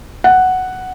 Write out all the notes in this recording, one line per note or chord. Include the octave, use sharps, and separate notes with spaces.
F#5